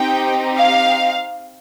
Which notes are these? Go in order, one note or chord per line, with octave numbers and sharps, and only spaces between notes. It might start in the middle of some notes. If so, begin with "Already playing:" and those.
Already playing: C4 D#4 G4 G5
F5